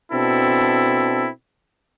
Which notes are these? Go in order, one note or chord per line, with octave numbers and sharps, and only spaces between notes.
B2 C4 D4 E4 A4